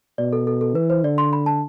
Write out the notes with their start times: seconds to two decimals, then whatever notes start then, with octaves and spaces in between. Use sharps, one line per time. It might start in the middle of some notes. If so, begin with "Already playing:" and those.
0.18 B2 D5
0.33 A4
0.47 A4
0.61 A4
0.75 E3 B4
0.90 C5
1.04 D3 D5
1.18 C6
1.33 B5
1.46 A5